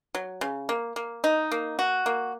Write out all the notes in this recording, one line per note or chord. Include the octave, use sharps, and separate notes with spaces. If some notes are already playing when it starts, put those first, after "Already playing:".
F#3
C#3
A#3
A#3
D#4
A#3
F#4
A#3